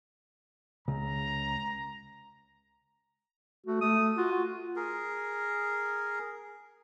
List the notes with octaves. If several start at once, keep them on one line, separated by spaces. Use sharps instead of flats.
C#2 A#5
A3 F#4
A3 D#6
F4 F#4
F#4
G#4 A#4